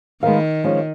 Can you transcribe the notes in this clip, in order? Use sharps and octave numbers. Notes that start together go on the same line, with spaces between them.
D#3 G#3 B3 F4 A#4 F5
F3 G#3 C#4